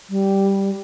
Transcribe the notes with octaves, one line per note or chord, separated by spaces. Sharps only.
G3